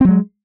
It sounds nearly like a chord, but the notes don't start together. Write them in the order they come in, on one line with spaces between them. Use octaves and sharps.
C4 F#3 G#3